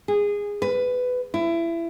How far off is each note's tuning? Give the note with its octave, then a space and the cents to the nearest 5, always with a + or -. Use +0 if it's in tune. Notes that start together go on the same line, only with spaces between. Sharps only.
G#4 -15
B4 +15
E4 +25